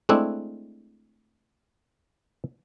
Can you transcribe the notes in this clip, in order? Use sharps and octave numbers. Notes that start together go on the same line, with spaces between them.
G#3 A3 C4 D4 E4